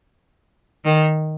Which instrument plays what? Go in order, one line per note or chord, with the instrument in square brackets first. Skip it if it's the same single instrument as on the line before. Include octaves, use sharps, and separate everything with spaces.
[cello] D#3